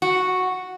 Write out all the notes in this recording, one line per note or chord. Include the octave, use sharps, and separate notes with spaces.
F#4